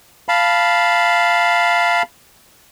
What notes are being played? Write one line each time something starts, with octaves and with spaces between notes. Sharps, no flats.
F5 A5 B5